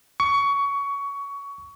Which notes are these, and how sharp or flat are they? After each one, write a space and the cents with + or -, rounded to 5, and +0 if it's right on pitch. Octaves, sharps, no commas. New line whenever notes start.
C#6 +20